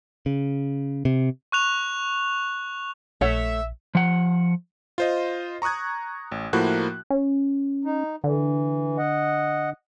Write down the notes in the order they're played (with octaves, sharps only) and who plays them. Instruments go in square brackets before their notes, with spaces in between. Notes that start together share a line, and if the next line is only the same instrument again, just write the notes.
[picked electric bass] C#3
C3
[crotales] C#6 F#6 F7
[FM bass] A#1 [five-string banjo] A3 C#5 F#5 [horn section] E5
[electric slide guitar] F3 F#5
[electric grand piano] F4 C5 D#5
A#5 C#6 D#6 F#6 G#6
A1
A2 F3 A#3 E4 F#4 F#6
[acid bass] C#4
[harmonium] D#4
[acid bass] D3 [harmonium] E3
[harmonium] D#5 F#5